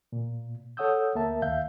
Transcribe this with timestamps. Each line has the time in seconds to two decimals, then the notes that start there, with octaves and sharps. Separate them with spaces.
0.12 A#2
0.77 A4 C#5 F#5 D#6 E6 G6
1.15 D2 A#3 A#4 E5 A5
1.42 D#2 E5 F5 G6